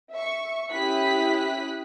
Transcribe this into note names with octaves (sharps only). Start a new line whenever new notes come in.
E5 C#6
C#4 E4 G4 D#6 F#6 B6